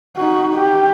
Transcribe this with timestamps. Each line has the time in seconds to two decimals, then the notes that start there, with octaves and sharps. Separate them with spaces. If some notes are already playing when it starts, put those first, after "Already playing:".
0.17 D#4 F#4
0.54 G4